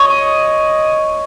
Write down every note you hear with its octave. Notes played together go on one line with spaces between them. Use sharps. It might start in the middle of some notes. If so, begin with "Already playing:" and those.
Already playing: C#5 D#5